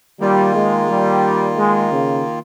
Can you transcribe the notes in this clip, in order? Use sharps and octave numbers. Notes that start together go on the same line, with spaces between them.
D#3 G3 A#3 F4
G#3
G3
G#3
C#3